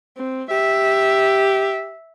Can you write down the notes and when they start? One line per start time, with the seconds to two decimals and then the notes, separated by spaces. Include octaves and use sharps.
0.17 C4
0.51 G4 E5